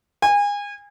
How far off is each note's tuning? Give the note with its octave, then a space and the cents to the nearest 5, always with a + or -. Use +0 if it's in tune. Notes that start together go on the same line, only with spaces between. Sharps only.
G#5 -30